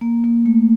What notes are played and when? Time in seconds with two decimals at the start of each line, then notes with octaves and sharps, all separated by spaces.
0.01 A#3
0.24 A#3
0.46 A3